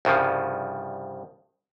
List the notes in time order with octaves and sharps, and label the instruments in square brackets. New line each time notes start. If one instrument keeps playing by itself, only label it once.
[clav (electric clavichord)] C2 G2 C#3 F3